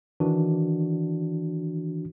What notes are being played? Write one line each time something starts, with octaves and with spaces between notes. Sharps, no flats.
D#3 E3 D4 F#4